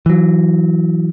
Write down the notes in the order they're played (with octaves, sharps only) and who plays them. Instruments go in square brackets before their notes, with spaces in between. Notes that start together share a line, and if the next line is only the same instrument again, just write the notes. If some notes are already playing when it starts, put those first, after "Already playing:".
[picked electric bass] E3 F#3